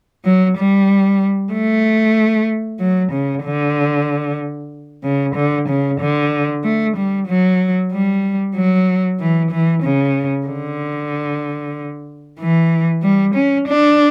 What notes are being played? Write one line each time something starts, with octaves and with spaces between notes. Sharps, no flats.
F#3
G3
A3
F#3
C#3
D3
C#3
D3
C#3
D3
A3
G3
F#3
G3
F#3
E3
E3
C#3
D3
E3
G3
C#4
D4